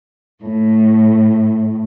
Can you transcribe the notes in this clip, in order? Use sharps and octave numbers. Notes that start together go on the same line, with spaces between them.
A2